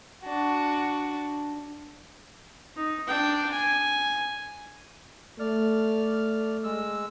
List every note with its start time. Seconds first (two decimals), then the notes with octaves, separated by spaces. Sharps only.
0.23 D4 F#4
2.76 D#4
3.07 D4 G5
3.51 G#5
5.39 A3 D5 F6
6.64 G#3 E6